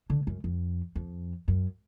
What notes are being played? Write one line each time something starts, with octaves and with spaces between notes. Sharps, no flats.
D3
F#2
F2
F2
F#2